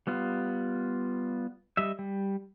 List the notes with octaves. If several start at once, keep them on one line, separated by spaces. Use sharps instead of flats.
G3 B3 F4
G3 D#5 E5
G3